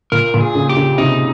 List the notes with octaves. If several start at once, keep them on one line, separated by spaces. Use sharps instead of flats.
A#2 A#4
A#2
G#4
C#3
G4
C#3
C3 D#4